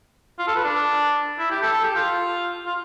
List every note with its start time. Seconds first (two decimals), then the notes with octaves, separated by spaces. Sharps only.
0.39 F4
0.47 A4
0.55 B4
0.64 D4
1.39 E4
1.50 G4
1.62 A4
1.72 A4
1.83 G4
1.95 F4
2.66 F4